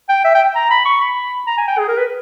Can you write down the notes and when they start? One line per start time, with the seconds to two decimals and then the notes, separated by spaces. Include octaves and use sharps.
0.09 G5
0.24 E5
0.35 G5
0.55 A#5
0.70 B5
0.86 C#6
1.01 B5
1.47 A#5
1.58 G#5
1.67 G5
1.78 G#4
1.88 A#4
1.98 B4